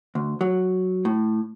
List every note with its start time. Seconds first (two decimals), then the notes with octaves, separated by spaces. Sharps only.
0.15 D2
0.41 F#3
1.05 A2